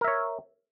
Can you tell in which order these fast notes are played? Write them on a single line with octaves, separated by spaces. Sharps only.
A#4 E5 C#5